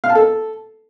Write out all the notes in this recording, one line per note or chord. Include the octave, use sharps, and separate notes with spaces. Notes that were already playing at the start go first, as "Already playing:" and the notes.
F5
A5
A4